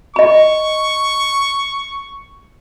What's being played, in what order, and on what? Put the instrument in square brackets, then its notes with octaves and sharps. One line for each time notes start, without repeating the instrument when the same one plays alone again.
[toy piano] D#5 B5 [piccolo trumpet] C#6